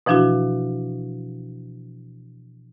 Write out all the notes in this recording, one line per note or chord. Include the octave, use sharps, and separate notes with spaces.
B2 E3 F3 D4 E4 F#4